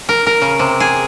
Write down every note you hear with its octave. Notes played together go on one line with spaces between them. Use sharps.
A#4
A#4
C#3
C3
G#4